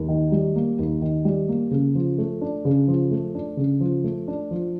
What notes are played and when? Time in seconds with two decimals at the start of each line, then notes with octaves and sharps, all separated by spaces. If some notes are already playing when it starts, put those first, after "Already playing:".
Already playing: D#2
0.09 D#3
0.32 G3
0.56 A#3
0.79 D#2
1.02 D#3
1.25 G3
1.49 A#3
1.71 C#3
1.95 F3
2.18 A3
2.41 D4
2.65 C#3
2.88 F3
3.11 A3
3.35 D4
3.57 C#3
3.80 F3
4.04 A3
4.28 D4
4.51 F3